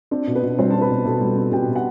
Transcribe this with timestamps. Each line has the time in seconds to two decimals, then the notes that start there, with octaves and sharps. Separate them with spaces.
0.11 C4 D4 D5
0.27 B2
0.35 B3 B4
0.43 B2
0.58 G3 C4 C5
0.70 C4 A5
0.81 B4 B5
0.90 B2
1.05 B2 A4 A5
1.21 G3
1.37 C4
1.52 B2 G4 G5
1.67 B2
1.76 F#5